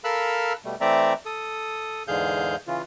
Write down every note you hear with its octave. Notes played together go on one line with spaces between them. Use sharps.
A4 A#4 F5 B5 E6 F#6
B2 G3 A3
E3 A3 C4 D5 E5 A#5
A4 D#6
E2 G#2 D3 G#4 F5 G6
C#3 E3 F4